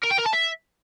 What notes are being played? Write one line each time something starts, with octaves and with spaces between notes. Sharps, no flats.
A#4
G5
A#4
A5
E5